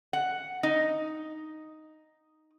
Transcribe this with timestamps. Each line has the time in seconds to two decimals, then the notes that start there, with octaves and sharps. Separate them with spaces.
0.13 F#5
0.63 D#4